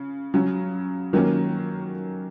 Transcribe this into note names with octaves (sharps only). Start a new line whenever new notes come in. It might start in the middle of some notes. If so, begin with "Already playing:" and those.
Already playing: C#3
C#3 F#3 C#4
D#3 F#3 A#3 C#4